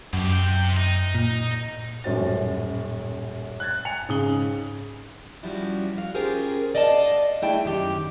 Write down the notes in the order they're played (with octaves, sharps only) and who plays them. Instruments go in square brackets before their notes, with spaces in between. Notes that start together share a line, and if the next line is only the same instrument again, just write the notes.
[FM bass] F#2 [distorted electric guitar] B2 G4
[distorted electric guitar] C3 G5
D#4
[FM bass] A#2
[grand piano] D#1 A1 F#2 F#3 C5 A6
F#6 G#6 A6
G#5 C#7 F7
G#2 C#3 G#4 D#6 F#7 G7
[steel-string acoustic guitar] F3 G3 C#4 E4 F#4
F#4 F5
C#4 F4 G4 G#4 A#4 C5
D5 D#5 F5 F#5 A5
A3 D4 E4 G#4 G5 A5
F#2 D#3 G4